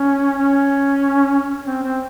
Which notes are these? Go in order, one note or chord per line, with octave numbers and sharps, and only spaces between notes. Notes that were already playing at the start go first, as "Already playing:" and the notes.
Already playing: C#4
C#4
C4
C4